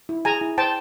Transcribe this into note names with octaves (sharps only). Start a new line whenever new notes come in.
E4
G#4 G#5 A#5
E4
C5 G5 A5